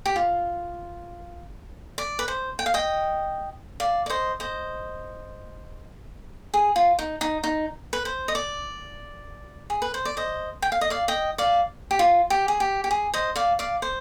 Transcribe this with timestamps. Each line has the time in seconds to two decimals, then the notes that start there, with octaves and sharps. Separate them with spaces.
0.06 G4
0.16 F4
1.98 D5
2.19 B4
2.28 C5
2.59 G5
2.66 F5
2.74 D#5 G5
3.80 D5 F5
4.06 D5
4.10 C5 D#5
4.40 C5 D#5
6.54 G#4
6.76 F4
6.99 D#4
7.21 D#4
7.44 D#4
7.93 B4
8.05 C5
8.28 D#5
8.35 D5
9.70 G#4
9.82 B4
9.94 C5
10.05 D5
10.17 C5 D#5
10.62 G5
10.72 F5
10.81 D#5
10.90 D5 F5
11.08 D#5 G5
11.38 D5 F5
11.91 G4
11.99 F4
12.30 G4
12.48 G#4
12.60 G4
12.84 G4
12.91 G#4
13.14 C5 D#5
13.36 D5 F5
13.59 D5 F5
13.82 C5